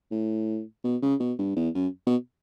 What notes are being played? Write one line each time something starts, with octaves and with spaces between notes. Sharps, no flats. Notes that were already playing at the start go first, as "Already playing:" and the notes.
A2
B2
C#3
B2
G2
E2
F#2
B2